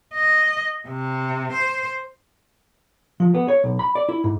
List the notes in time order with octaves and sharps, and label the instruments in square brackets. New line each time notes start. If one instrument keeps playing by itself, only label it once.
[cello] D#5
C3
C5
[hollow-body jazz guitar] F3
B3
C#5
B1
B5
D5
E4
G#2